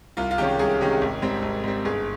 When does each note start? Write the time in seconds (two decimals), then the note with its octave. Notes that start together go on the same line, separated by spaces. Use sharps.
0.17 C2 F4
0.31 F4
0.38 C3 D#3 G#3 C#4 G4
0.59 C2 G#4
0.81 C3 D#3 G#3 C#4
1.01 G#1
1.22 G#2 G3 C4
1.42 G#1
1.64 G#2 G3 C4
1.85 G1 G#4